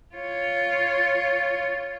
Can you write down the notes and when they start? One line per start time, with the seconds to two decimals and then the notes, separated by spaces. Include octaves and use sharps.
0.15 F4 C#5